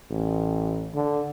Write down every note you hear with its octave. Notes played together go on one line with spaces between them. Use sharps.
A1
D3